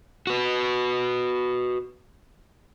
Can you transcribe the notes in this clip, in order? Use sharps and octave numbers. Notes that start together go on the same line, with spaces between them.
F#4 B4